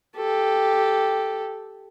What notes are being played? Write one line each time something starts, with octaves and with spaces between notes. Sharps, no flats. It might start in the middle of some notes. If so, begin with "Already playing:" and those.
G4 A4